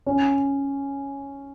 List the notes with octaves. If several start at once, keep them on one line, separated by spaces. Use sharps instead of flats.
C#4